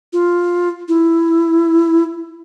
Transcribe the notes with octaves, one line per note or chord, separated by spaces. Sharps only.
F4
E4